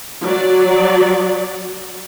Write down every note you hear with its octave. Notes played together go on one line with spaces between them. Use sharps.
F#3 D5